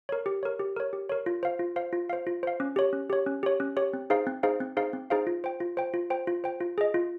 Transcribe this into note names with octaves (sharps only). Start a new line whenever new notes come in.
A#4 C#5
G4
A#4 C#5
G4
A#4 C#5
G4
A#4 C#5
F4
C5 F5
F4
C5 F5
F4
C5 F5
F4
C5 F5
C#4
G4 C#5
C#4
G4 C#5
C#4
G4 C#5
C#4
G4 C#5
C4
D#4 G#4 C5 F5
C4
D#4 G#4 C5 F5
C4
D#4 G#4 C5 F5
C4
D#4 G#4 C5 F5
F4
C5 G5
F4
C5 G5
F4
C5 G5
F4
C5 G5
F4
G#4 D#5
F4